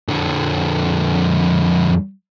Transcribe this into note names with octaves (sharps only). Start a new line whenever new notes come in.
F2 D3